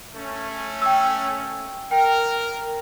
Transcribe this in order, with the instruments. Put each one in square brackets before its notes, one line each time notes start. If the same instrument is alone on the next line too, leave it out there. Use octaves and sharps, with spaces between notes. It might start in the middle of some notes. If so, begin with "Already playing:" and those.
[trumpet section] A3 C#4
[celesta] G5 E6
[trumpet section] A#4 [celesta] G5